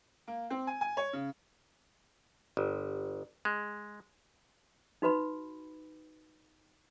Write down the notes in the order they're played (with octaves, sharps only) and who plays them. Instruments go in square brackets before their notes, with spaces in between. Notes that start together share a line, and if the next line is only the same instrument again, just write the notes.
[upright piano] A#3
C4
G#5
G#5
C#5
C#3
[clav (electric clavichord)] G1
G#3
[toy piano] D#4 F#4 B4 B5